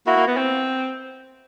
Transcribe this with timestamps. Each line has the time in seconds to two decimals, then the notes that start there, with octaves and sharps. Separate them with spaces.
0.06 A#3 E4 F#4
0.17 A#3
0.27 B3
0.37 C4